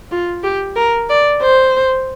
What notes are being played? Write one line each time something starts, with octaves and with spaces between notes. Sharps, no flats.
F4
G4
A#4
D5
C5